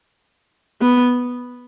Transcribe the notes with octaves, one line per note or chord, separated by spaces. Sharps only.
B3